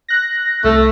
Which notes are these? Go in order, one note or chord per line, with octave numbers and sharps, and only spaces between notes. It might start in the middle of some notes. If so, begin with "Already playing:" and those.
F#6 A#6
C2 A3